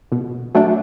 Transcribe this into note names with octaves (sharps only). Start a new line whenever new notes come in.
B2
F#3 A3 D4